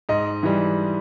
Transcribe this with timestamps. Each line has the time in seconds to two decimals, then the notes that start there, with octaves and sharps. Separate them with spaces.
0.09 G#2 D#5
0.43 E3 G3